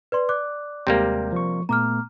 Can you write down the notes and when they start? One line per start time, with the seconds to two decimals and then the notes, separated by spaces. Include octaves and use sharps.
0.12 B4 D5 C6
0.29 D5 D6 F#6
0.87 D#2 C3 G3 G#3 A#3 G5 G6
1.32 F3 C#6
1.69 A#2 A3 B3 A#5 D6 F6